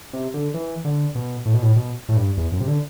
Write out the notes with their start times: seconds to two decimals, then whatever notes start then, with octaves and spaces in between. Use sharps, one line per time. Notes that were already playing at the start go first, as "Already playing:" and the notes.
0.13 C3
0.34 D3
0.54 E3
0.85 D3
1.15 B2
1.46 A2
1.54 B2
1.62 A2
1.76 B2
2.09 A2
2.17 G2
2.37 E2
2.52 F#2
2.61 C3
2.67 D3